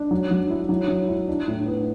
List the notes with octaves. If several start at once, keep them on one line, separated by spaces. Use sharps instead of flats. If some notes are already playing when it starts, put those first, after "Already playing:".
Already playing: D4
F#3
F#3
E4
F#3
F#3
E4
D4
A2
B3